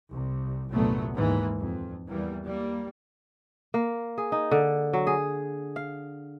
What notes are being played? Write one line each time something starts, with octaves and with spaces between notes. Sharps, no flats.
C2
G1 C2 A#2 F#3 A3 B3
D#2 G#2 E3 A#3
F2
E2 E3 G3 A#3
G3 A#3
A#3
G#4
D#4
D3
F#3
G#4
F5